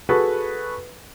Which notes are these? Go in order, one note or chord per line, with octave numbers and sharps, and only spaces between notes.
F#4 G#4 A4 B4